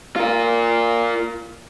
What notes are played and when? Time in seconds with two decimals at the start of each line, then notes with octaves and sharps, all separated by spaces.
0.16 F4 A#4